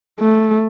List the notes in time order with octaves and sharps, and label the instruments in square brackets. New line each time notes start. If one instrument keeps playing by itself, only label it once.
[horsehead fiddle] A3